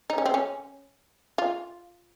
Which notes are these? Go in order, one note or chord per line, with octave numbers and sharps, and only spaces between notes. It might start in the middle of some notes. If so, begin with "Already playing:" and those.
D#4
C#4
C4
C#4
F4